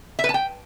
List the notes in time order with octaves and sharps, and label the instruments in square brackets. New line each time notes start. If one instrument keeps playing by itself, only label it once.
[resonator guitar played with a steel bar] E5
B4
A5
G5